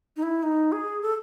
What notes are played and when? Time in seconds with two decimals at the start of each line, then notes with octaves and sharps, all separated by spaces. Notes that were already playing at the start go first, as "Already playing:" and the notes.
0.17 D#4
0.23 E4
0.43 D#4
0.72 G#4
1.02 A4